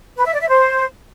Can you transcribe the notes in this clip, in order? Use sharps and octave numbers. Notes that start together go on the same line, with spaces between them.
B4
E5
D5
E5
C5